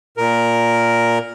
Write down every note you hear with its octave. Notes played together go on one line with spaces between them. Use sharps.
A#2 A#4